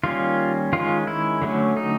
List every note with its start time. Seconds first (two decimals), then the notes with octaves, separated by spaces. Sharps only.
0.03 D#3 G3 A#3 C#4 F4
0.73 D#3 G#3 C#4 F4
1.07 E4
1.42 D3 F#3 A3 C#4
1.77 D#4